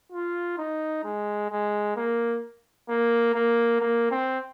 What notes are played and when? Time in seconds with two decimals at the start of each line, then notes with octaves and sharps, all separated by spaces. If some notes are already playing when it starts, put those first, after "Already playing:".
0.12 F4
0.58 D#4
1.04 G#3
1.51 G#3
1.96 A#3
2.89 A#3
3.34 A#3
3.80 A#3
4.11 C4